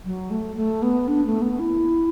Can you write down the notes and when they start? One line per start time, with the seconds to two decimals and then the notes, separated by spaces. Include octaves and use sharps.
0.05 F#3
0.31 A3
0.56 A3
0.82 B3
1.08 D4
1.25 A3
1.42 B3
1.59 E4